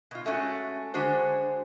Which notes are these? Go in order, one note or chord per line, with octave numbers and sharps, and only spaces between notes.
B2 F4
G#3 A3 C#4 E4 F#4
D3 G#3 D4 F#4 C5